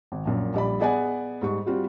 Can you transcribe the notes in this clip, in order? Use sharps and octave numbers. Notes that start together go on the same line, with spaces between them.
G#1
A#1 F#2 A#2
A#1 G3 D5 B5
B3 G#4 D5 F#5 G#5
G#2 G3 C#6
G3 C4 F4 F#4